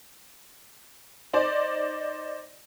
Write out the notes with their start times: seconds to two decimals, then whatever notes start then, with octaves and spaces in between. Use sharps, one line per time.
1.34 D#4 C5 D5